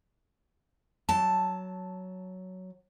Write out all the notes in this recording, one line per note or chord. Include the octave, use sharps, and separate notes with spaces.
F#3 A5